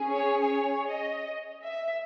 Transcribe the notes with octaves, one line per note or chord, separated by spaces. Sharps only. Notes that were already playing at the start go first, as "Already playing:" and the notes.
Already playing: C#4 G#4
C#5
C#5
D#5
E5